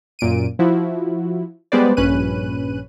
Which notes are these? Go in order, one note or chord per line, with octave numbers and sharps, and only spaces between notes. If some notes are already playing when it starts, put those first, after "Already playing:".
F#2 A#2 D7 D#7
F3 E4 F#4
G3 G#3 B3 B4 C5 D5
A#1 G2 C#4 B4 F#6 D#7